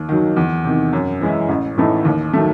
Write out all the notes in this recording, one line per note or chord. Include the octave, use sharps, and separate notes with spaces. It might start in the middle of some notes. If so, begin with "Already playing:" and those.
Already playing: D#2
D#3 F#3
E2
C3 D#3
F#2
E3 G#3 C#4 E4
A1
A2 E3 A3 D#4
D#2
D#3 F#3 A3